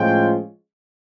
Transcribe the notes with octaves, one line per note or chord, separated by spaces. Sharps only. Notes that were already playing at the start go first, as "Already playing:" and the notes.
Already playing: A2 F3 G#3 C#4 F4 G5